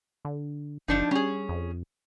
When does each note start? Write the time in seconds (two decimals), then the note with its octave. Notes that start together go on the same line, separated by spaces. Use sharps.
0.25 D3
0.88 F#1 F3 D4 D#4
1.11 G3 C#4 G#4
1.49 F2